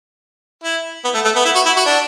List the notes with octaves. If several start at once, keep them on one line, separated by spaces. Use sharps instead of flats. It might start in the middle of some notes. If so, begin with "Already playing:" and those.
E4
B3
A3
A3
B3
E4
F#4
E4
F#4
D4